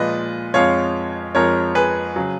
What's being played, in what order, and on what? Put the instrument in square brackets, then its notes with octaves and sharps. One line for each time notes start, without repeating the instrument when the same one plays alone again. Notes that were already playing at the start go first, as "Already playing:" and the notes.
Already playing: [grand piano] A#2 F3 G#3 B4 D#5
F2 F3 G#3 C#5 F5
F2 F3 G#3 A#4 C#5
G#4 B4
C#3 F#3